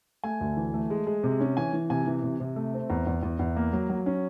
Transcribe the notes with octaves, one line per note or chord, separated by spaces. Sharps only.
A3 G#5
D2
E3
A3
G#3
G#3
C3
C#4
E3 G#5
E3
C3 G#5
E3
C3
C3
A3
C4
E2 A#5
E2
E2
E2
A#3
F#3
F#3
C#4